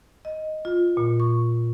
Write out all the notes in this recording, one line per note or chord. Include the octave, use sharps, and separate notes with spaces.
D#5
F4
A#2
C#6